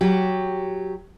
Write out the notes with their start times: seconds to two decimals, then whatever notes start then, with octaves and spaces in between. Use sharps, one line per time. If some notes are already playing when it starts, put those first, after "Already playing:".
0.01 F#3 G4